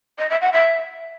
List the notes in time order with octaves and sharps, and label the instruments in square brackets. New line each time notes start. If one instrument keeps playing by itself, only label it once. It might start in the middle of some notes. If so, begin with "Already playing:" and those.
[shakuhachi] D#5
E5
F#5
E5